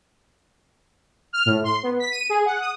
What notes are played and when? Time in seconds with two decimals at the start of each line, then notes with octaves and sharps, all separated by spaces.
1.33 F6
1.46 A2
1.64 C6
1.83 B3
2.00 B6
2.12 D#7
2.29 G#4
2.46 F#5
2.60 D#6